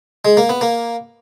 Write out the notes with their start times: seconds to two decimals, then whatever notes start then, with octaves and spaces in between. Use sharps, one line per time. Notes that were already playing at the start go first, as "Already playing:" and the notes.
0.25 G#3
0.37 A#3
0.49 B3
0.61 A#3